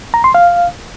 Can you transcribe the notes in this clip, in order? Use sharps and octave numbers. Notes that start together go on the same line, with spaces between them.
A#5
C6
F5